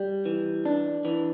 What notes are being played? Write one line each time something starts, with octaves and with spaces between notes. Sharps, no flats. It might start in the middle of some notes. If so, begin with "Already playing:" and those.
Already playing: G3
E3
D4
E3